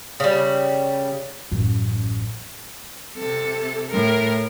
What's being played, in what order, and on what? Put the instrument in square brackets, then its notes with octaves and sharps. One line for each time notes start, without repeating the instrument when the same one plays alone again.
[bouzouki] C#3 G3
[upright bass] A1 F#2
[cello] C3 A4
A2 A#4